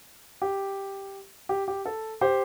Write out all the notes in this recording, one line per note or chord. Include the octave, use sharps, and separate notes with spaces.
G4
G4
G4
A4
G4 C5